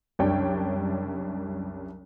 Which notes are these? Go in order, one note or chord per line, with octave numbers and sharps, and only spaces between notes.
F#1 C2 D4 C#5 G5